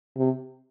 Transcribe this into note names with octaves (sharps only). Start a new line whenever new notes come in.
C3